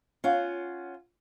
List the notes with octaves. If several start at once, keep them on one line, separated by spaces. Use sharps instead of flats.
C#4 F4 F#5